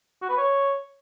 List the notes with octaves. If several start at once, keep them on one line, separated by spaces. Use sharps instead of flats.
F#4
B4
C#5